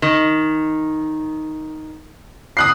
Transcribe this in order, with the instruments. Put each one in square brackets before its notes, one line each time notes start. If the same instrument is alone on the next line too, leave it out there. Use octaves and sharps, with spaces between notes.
[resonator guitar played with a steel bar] D#3
[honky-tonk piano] D#6 F#6 C7